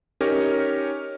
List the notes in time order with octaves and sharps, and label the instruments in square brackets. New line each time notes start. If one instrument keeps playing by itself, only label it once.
[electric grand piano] C#4 D#4 G4 A#4 C#5